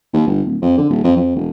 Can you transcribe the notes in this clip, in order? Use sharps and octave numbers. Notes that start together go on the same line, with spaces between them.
D#2
G1
D1
F2
D3
D#1
F2
F2
E1